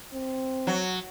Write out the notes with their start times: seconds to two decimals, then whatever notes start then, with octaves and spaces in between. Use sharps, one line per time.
0.14 C4
0.67 F#3